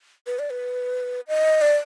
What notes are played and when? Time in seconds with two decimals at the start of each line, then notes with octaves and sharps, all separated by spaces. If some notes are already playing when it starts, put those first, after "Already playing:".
0.26 B4
0.39 D5
0.50 B4
1.28 D#5
1.61 D5